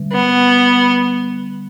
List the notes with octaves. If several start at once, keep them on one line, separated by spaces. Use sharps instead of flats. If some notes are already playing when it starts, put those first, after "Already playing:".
Already playing: D3 G3
B3